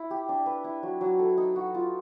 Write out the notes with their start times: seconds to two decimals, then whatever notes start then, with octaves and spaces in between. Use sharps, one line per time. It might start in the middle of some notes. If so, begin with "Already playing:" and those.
Already playing: E4
0.11 G4
0.29 D4
0.46 B4
0.64 E4
0.83 F#3
1.01 F#3
1.19 A4
1.38 D#4
1.56 F#4
1.74 F4